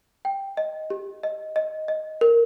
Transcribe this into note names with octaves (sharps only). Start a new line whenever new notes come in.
G5
D#5
G4
D#5
D#5
D#5
A#4